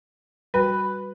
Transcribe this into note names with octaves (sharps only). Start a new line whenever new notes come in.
G3 F#4 B4